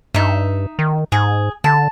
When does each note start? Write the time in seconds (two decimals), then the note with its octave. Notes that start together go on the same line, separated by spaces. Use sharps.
0.14 G2 D#4 E5
0.79 D#3
1.12 G#2 G#4
1.64 D3 A5